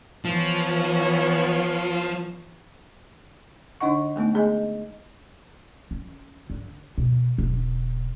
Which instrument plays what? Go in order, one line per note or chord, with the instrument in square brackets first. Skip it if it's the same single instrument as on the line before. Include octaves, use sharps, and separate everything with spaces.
[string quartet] E3 B3 C#5 [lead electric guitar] F3
[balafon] D3 D4 D#4 D#5 F#5 C#6
G#3 A3 B3 D#4
A3 G#4 D#5 G#5
[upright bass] C#3
D3
B2
E1